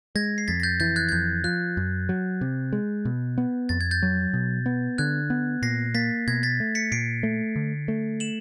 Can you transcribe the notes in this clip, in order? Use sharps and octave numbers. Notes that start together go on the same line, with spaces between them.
G#3 G#6 A#6
C7
F2 A6 B6
A#6
G6 A6
E3 G6 A6
F#6 G#6
G#6
F2 G6
F3 F#6
F#2
F#3
C3
G#3
B2
B3
F2 A6
G#6
G6 A6
F#3
B2
B3
D3 F#6 G#6
B3
A#2 A#6 C7
A#3 A6 B6
B2 G#6 A#6
A6 B6
A3
B6 C#7
A#2 C7 D7
A3
D3
A3
E7 F#7